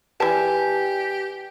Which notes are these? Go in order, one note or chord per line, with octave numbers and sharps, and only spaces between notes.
E3 G4 B4 D5 G#5 A5